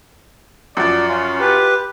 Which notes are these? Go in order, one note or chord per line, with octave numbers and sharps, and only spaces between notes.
F#2 F3 D5
C#4 F4
G4 B4